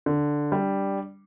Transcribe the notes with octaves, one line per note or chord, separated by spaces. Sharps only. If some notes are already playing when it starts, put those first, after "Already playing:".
D3
G3 D4